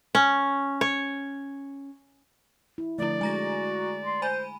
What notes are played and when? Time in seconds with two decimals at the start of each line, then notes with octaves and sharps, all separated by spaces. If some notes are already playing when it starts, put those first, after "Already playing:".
0.15 C#4
0.81 C#5
2.78 E4
2.98 D3 F3 A3 E4 D5
3.21 G#3 F#4 G#5 A#5 A#6
4.05 C6
4.22 C5 G#5 B5 D#7